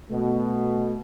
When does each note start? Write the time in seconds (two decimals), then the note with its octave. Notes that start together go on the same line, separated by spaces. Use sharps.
0.11 B2 A3